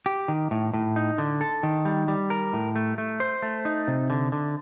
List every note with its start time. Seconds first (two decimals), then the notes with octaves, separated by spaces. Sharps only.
0.06 G4
0.28 D#3
0.51 A2
0.74 A2
0.96 D#4
1.18 D3
1.41 A4
1.63 D#3
1.85 G3
2.08 G3
2.30 A#4
2.53 A2
2.76 A3
2.98 A3
3.20 C5
3.42 A3
3.65 D#4
3.88 C3
4.10 D3
4.32 D3